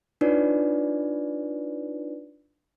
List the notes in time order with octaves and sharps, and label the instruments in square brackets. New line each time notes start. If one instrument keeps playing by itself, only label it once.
[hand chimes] D4 D#4 F4 B4 C#5 D5